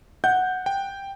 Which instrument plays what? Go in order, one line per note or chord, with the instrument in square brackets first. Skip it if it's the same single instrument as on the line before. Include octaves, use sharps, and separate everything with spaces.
[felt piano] F#5 [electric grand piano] G6
[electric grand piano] G5